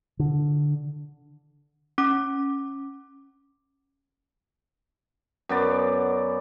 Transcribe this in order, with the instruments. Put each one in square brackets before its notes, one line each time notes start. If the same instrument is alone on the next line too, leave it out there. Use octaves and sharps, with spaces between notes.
[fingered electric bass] D3
[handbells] C#4 D6
[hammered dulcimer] F#2 B3 D5